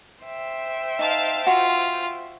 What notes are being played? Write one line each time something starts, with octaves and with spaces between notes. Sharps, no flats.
C5 E5 G5
D#4 F5 A5
F4 F#4